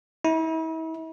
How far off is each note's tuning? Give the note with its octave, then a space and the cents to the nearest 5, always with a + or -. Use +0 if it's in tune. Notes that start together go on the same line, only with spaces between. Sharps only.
E4 -40